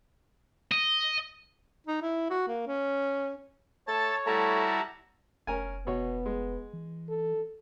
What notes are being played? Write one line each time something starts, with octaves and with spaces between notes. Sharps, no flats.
D#5
D#4
E4
F#4
A#3
C#4
A3 A4 C#5 A5 A6
G3 A3 E4 F#4 A5 A#5
F1 C#4 A#4 G#5
B2 B3 C#5
G#3
E3
A4